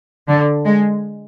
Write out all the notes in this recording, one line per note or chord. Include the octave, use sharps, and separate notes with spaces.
D3
G#3